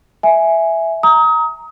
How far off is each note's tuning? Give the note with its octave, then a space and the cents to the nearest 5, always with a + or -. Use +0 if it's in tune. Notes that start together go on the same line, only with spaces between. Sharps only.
E5 +0 G#5 +0
A#5 +0 D#6 +35